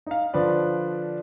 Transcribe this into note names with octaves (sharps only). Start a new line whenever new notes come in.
D#4 F5
D3 F3 D4 B4 D5